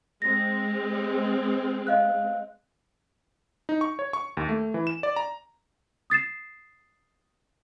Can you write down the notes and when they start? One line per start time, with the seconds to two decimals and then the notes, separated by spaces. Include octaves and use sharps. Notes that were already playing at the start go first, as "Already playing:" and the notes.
0.22 G#3 C4 A#6
1.87 D#5 F5 F#6
3.69 D#4
3.81 C#6
3.99 C#5
4.13 C#6
4.37 D#2
4.49 A3
4.74 E3
4.87 E7
5.03 D5
5.16 A#5
6.10 D#6 A6 C7 E7